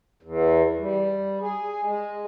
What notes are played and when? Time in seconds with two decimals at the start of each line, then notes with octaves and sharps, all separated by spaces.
0.23 E2
0.79 G3
1.41 G#4
1.84 G#3